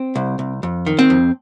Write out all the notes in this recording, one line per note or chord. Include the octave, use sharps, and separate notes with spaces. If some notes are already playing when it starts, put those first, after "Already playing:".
Already playing: C4
C2
C2
F2
D#3
C4
F2